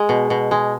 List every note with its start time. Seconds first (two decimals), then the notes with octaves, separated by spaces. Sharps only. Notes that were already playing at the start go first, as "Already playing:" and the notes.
Already playing: G#3
0.09 B2
0.30 B2
0.51 G#3